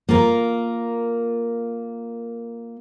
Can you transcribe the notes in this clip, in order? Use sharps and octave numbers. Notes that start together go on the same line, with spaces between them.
A#3 F4 A#4